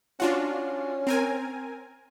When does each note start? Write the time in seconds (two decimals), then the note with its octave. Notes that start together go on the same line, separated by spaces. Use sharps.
0.20 C#4 D4 F4 F#4
1.07 C4 A#4 G#5